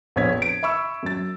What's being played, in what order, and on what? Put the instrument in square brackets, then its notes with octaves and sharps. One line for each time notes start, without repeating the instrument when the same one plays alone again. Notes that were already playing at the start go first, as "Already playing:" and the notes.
[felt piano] A#1 F2 B3 C#5 G#6 B6
D7
E5 B5 C#6 E6
F#2 A6